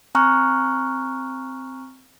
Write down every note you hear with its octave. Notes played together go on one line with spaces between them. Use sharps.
C4 G#5 A#5 C#6 F6 F#6